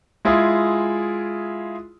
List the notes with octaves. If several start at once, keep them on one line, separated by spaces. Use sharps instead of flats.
G#3 E4 F4 G#4